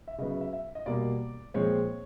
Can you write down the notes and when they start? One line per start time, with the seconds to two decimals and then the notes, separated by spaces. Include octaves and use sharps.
0.08 E5
0.18 C#3 F#3 B3 D#5
0.30 E5
0.41 E5
0.53 E5
0.75 D#5
0.86 B2 G3 A#3 D5
1.54 A#2 F3 G#3 C4 C#5